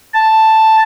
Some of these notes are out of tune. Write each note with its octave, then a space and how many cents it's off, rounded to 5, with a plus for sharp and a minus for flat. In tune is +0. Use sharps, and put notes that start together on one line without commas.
A5 +0